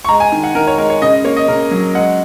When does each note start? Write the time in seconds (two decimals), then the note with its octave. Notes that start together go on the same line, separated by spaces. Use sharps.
0.05 C#6
0.09 G#3 A#5
0.20 G#5
0.32 D#3
0.43 F#5
0.55 D#3 A#4
0.67 C#5
0.78 G#3 A#4
0.90 C#5
1.02 C#3 D#5
1.13 D#5
1.25 A#3 C#5
1.36 D#5
1.48 C#3 A#4
1.71 F#3
1.95 G#3 F#5